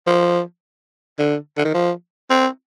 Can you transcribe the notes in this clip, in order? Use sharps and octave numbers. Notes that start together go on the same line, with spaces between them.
F3
D3
D3
D#3
F3
C4